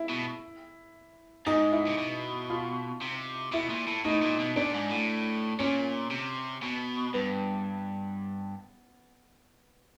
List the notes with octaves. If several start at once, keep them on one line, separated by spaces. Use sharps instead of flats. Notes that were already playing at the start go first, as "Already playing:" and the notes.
Already playing: E4
B2
G#2 D#4
E4
C3
B2
F4
C3
B2 E4
A#2
A2
A2 D#4
A#2
B2
A#2 D4
G#2
A2
A#2 C#4
C3
B2
G2 B3